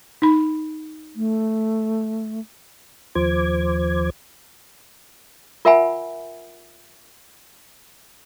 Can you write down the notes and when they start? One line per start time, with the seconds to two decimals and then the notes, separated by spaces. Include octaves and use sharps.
0.22 D#4 B5
1.16 A3
3.15 D#2 F3 C5 D6 G#6
5.65 F4 A#4 E5 F#5 G#5 B5